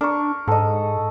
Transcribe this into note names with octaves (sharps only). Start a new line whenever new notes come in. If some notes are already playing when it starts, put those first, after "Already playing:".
D4 A#4 C#6
G#2 A4 D#5